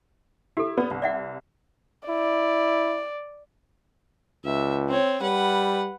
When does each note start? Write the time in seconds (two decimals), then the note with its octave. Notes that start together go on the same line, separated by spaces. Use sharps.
0.57 E4 G4 A4
0.78 B3 B4 D5
0.91 C2
1.02 D5 E5 F#5
2.09 E4 D5
4.45 C#2 E5
4.88 C4 C#5
5.22 G3 B4 F#5